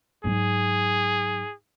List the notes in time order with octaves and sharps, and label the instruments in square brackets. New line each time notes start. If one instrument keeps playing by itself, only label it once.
[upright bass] G#2 F#3 [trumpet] G#4